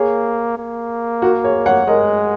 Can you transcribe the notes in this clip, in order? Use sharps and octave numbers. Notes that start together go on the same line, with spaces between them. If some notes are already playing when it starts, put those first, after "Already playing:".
Already playing: A#3 G#4 C#5
A#3
F#4 A#4
G#4 C#5
C#5 F#5
G#3 A#4 D#5